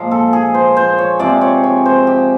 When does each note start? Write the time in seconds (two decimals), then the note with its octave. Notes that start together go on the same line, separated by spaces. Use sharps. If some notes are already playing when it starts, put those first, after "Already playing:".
Already playing: A#2 F3 G#3
0.11 A4
0.33 G#4
0.54 C5
0.77 C5
0.98 C#5
1.19 C3 F3 G#3 D5
1.41 C#5
1.64 C#5
1.85 C5
2.07 G4